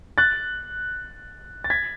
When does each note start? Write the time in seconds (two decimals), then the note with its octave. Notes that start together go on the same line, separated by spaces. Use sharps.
0.18 F#6 A6
1.64 A6
1.70 G#6 B6